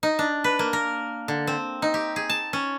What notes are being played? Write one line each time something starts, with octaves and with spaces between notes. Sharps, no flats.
D#4
D4
B4
A#3
A#4
D3
C4
D#4
G4
G#4
A5
C#4